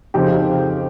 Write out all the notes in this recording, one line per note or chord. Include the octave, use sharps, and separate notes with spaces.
F2 C#3 F3 C4 D#4 G4